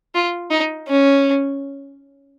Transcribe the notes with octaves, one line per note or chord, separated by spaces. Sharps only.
F4
D#4
C#4